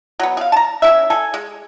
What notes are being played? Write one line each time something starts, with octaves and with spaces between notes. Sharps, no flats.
F#3 B3
G#4 F5
A5 A#5
C#4 E4 E5
A4 G#5
G#3